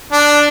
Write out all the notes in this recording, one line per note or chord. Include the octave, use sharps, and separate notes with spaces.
D4